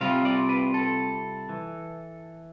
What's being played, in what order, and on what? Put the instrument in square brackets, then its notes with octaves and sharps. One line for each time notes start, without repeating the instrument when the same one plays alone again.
[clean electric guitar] C3 G3 C4 F4 F5
D5
B4
A4
E3